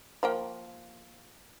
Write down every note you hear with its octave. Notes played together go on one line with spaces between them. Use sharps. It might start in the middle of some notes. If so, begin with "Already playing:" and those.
F3 A#3 G5